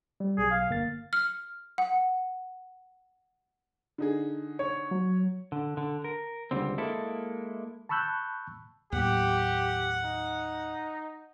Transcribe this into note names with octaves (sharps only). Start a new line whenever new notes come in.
G3
B1 G#4
F5
G1 A#3 A6
F6
F#5
D3 D#4 G#4
C#5
F#3
D3
D3
A#4
C#2 D3 G3 C4
G#3 A#3 E4 A4
A5 B5 C#6 E6 F#6 G6
D#2 A2 F#3 G4 F#5
D#4